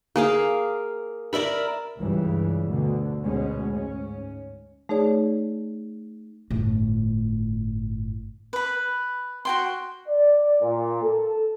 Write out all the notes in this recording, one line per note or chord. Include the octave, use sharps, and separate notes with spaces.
A#3 G#4 F5
A#4 D5 E5 B5
C#2 G2 C#3 E3 G3
D2 B2 D3
D2 B2 G#3 C#4
G#2 C#4
A3 D#4 G#4 C#5 D5
G1 A2
B4 B5
F#4 G5 C6
D5
A#2
A4